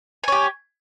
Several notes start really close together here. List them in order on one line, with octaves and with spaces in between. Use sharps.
G#5 C#5 G4